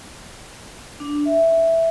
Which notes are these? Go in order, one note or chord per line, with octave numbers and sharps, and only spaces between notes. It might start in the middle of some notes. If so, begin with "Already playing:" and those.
D4
E5